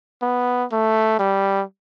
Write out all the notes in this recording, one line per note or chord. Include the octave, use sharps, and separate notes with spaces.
B3
A3
G3